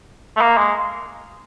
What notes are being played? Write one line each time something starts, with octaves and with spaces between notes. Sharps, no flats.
A3
A#3
G#3